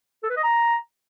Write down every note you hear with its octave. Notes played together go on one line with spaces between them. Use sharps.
A4
B4
D#5
A#5